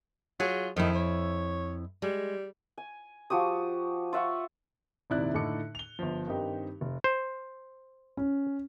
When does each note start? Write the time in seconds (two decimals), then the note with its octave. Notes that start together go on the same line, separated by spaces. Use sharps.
0.40 F#3 F4 G#4
0.76 F2 D#3 E4
0.95 C#5
2.02 G3 G#3
2.78 G#5
3.30 F3 F#4 G4 D#6
4.13 F4 E5 F#5 C#6
5.10 D#1 G#2 C3 E4 D5 F#6
5.34 A2 D3 D#4 A4 D6 C#7
5.75 F7 G7
5.99 G1 F3
6.27 G2 D#3 C4 D#4 G4
6.81 F1
7.04 C5
8.17 C#4